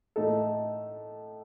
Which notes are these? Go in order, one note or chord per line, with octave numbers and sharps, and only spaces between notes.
A2 A3 D#4 A4